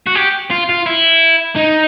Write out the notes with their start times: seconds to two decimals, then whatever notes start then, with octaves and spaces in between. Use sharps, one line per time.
0.06 F#4
0.15 G4
0.50 F4
0.69 F4
0.86 E4
1.56 D#4